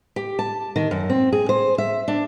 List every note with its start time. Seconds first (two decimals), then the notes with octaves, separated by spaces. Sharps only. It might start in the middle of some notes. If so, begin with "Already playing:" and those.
0.16 G4
0.39 A5
0.76 D#3
0.91 F#2
1.10 C4
1.32 G#4
1.49 C5
1.78 E5
2.08 D4